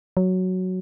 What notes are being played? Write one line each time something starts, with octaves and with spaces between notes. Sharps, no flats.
F#3